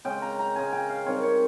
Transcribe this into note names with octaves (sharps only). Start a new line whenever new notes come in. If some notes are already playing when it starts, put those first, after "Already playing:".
C#3 G#3 C#4 G5
A#5
A#5
C#3 G#3 C#4 G#5
G5
F5
D#3 G3 C4 C#5
C#5